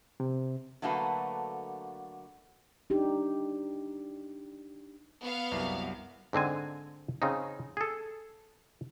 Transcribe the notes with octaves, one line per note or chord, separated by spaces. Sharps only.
C3
D3 F#3 A3 A#3 F#4 B4
D4 D#4 G4
B3 F5
C2 F#2
G#2 D3 C4 G#5
C#3 C4 D#4
G#4 A4